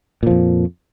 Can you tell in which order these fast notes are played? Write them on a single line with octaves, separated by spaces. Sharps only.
A#2 F3 F2